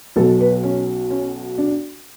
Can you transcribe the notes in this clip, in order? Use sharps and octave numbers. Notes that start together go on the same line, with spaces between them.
B1 B2 F#3 A4
B4
C#4
C#4
D4